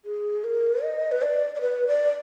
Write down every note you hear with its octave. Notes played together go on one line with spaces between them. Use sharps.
G#4
A#4
D#5
B4
D5
D5
B4
D5